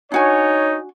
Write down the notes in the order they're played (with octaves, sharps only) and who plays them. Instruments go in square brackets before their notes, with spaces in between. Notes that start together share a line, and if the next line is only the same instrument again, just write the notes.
[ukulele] D4 F#4 G#5 [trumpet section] D#4 C#5